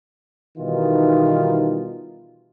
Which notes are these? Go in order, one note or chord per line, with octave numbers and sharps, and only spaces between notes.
B2 D#3 E3 G3 D#4 F4